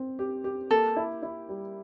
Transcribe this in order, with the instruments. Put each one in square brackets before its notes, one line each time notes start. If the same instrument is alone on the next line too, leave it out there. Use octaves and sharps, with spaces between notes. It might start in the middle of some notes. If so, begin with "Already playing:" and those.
Already playing: [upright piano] C4
G4
G4
[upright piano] A#3 [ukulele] A4
[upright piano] E4
E4
G3